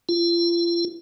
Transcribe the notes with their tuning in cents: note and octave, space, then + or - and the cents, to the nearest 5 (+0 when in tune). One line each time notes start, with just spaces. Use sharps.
F4 -35